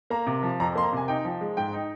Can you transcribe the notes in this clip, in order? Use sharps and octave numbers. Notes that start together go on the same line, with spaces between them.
A#3 A#5
C3
F3
F2 A#5
A#3 C6
A#5
C3 G#5
D#4 G5
F3
G#3
G#2 G5
D#4